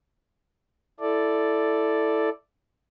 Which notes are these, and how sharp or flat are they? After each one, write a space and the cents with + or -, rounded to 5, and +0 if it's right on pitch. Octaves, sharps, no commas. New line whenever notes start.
E4 +0 A4 +0 D5 +0